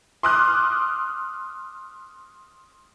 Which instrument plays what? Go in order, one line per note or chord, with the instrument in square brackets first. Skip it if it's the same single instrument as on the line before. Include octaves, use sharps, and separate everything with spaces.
[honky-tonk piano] C6 D6 D#6 F6 F#6